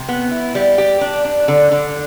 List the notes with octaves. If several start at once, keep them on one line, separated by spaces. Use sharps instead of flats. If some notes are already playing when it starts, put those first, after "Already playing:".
Already playing: C3
B3
E4
G3
G4
D4
D4
D3
D3